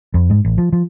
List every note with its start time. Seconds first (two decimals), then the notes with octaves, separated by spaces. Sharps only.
0.14 F2
0.30 G#2
0.45 A1
0.58 F3
0.72 F3